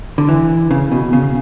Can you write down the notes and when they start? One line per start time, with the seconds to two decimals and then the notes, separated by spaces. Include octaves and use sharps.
0.18 D3
0.29 E3
0.71 C#3
0.92 B2
1.13 C#3